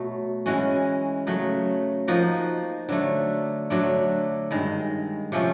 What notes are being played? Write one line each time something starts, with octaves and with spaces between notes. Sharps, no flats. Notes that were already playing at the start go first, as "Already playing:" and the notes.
Already playing: B2 F#3 A3
E3 G#3 C#4 F#4
C#3 F#3 A3
F3 A#3 D#4 F#4
D3 F#3 A3
D3 F#3 A3 D4
G2 D#3 G#3
C3 F3 A3 C#4